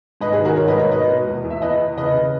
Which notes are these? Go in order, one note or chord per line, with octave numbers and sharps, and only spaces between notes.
G#2 B4 D#5
G#4 B4
D#3
F#4 A#4
G#2 A#4 C#5
B4 D#5
G#2
A#4 C#5
B2 B4 D#5
B2
E2
E2
E5
E2 B4 D#5
E3
C#3 B4 D#5
C#3